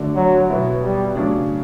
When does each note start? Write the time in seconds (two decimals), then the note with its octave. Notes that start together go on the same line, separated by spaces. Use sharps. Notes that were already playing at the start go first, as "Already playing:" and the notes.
Already playing: D3 A3 D4 F#4
0.16 F#3
0.49 B2 F#3 B3 E4
0.83 G3
1.16 C#3 F#3 A3 D4